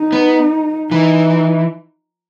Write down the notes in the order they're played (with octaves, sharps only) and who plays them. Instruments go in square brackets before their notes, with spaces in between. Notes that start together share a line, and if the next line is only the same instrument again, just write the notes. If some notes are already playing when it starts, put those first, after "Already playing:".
Already playing: [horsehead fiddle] D#4
[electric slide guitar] B3
[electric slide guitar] E3 [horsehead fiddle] D#4